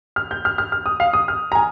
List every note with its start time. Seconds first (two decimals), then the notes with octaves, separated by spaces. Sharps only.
0.16 F6
0.31 G6
0.45 F6
0.58 F6
0.72 F6
0.86 D#6
1.00 F5
1.13 D#6
1.28 F6
1.52 A#5
1.55 G#5